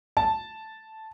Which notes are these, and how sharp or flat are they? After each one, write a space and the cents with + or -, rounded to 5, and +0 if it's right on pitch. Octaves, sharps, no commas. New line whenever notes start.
A5 -5